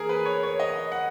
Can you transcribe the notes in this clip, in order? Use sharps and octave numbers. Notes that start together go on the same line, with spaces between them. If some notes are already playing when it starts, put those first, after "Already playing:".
Already playing: E3 A#3 G#4 A#4
B4
C#5
C#5
D#5
F#5